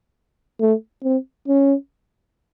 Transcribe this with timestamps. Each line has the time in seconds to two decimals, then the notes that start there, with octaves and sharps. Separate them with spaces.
0.60 A3
1.03 C4
1.48 C#4